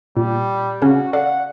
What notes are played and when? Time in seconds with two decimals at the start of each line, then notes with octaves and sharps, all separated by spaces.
0.17 A#2 G3
0.82 C#3 C#4 F#4
1.13 A4 D5 F5 F#5